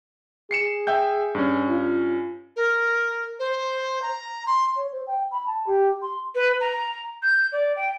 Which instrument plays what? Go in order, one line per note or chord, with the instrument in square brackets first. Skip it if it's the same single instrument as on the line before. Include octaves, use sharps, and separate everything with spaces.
[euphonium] G#4 [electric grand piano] C7 C#7 E7
[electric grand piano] E5 G5 G6
G2 C#4
[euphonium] F4
[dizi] A#4
C5
A#5
C6
[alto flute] C#5
C5
G5
B5
A5
G4
C6
[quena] B4
A#5
G6
D5
G5